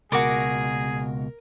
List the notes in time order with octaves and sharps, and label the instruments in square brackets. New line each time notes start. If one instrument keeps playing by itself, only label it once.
[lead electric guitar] C#2 B2 [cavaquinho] F#4 D6 [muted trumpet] G#4 [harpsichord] A#4